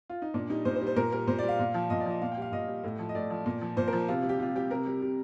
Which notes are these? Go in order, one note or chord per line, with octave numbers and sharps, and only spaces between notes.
F4
D#4
A#2 D4
G3 D#4
A#2 C5
C5
G3
C5
A#2 A#4
G3 A#4
A#2 C5
G3 D5
F5
A#2
F3
A#2 D#5
D5
F3 D#5
A#2 F5
G5
G3 F5
A#2 D#5
G3
A2
F3
D#5
A2 D5
F3
A#2
F3
A#2 C5
A#4
F3
C3 F4
G3
G4
C3 F4
G3 G4
C3 A#4
G3
C3